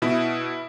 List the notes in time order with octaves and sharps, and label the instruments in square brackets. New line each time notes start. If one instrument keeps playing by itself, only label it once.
[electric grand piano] B2 E4